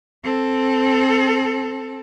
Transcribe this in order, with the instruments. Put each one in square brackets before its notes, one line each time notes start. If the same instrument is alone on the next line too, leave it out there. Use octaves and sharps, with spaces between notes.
[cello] C4 A4